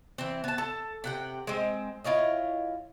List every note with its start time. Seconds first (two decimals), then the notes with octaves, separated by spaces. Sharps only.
0.18 E3 C4
0.44 B3 A5
0.58 A4
1.04 C3 F#5 G5
1.47 G#3 C4
2.04 E4 F4 C#5 D#5